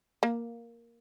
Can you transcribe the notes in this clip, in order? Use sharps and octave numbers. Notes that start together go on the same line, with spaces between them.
A#3